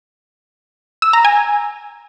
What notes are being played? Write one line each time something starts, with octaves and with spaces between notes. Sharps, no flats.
E6
A#5
G#5